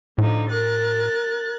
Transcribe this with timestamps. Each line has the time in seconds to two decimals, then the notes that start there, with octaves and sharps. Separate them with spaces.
0.18 A2 D3 F3 D#4
0.49 A#4 F#6 A6